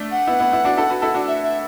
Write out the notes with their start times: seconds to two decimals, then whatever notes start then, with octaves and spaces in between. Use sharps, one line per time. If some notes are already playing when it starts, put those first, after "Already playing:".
Already playing: A3 D4
0.11 F#5
0.27 B3 E4
0.40 B3 E4
0.52 B3 E4
0.65 D4 F#4
0.77 E4 A4
0.90 F#4 B4
1.02 E4 A4
1.14 D4 F#4
1.27 E5
1.43 E5